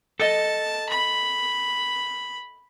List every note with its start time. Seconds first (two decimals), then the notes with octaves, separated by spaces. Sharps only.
0.20 A4 D#5 A5
0.89 B5